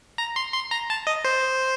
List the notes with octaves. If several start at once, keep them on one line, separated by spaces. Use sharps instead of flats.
A#5
C6
C6
A#5
A5
D#5
C5